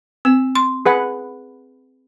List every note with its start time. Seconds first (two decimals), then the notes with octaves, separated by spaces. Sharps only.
0.25 C4 E6
0.55 C6
0.86 G#4 B4 F#5